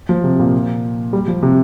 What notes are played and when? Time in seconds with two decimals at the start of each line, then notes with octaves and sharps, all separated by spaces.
0.09 F3
0.24 C3
0.39 A#2
1.13 G3
1.28 F3
1.43 C3